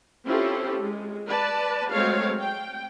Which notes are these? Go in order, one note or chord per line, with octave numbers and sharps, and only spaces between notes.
C4 C#4 E4 F4 G4 A4
G#3
B4 D5 A5
F#3 G#3 A3 C4 C#5 F5
G5